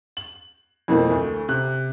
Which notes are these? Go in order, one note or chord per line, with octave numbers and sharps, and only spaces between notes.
F#7
F2 B2 E3 A3 A#3 C4
D2 A3
C3 F#6